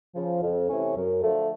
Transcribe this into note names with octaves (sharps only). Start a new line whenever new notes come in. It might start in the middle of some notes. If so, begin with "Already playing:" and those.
C#3 F3
F2
C3 E3 A3 C#4
F#2
D3 F3 A3